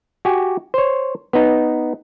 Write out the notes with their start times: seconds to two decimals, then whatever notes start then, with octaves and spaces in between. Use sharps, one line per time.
0.25 F#4 G4 G#5
0.74 C5 C#5
1.33 B3 D#4